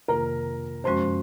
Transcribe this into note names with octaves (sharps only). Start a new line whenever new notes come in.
F2 C3 D#3 A#3 F4 A#4 A#5
F#2 F3 G#3 C#4 F#4 C5 C6